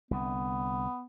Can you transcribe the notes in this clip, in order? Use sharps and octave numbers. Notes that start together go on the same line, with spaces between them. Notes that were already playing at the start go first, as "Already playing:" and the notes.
C2 D3 B3